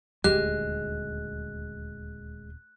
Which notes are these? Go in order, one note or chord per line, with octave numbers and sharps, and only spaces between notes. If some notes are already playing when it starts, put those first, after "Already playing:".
D#1 D2 G#3 G4 F#6